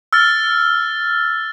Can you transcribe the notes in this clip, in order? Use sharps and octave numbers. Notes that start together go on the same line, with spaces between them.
E6 F6 A6